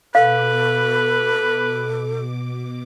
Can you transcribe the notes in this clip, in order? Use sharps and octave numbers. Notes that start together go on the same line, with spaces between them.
B2 A4 B4 F5 D6